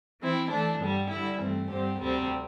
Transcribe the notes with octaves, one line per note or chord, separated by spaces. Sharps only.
E3 C4 E4
E3 A3 D4
G2 D3 G3
D3 G3 E4
G2 E3 A3 C4
G2 D3 C4 G4 C5
D2 C3 G3 C4 A4